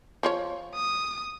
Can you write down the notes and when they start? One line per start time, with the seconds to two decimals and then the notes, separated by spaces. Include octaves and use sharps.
0.23 F3 F4 C#5
0.75 D#6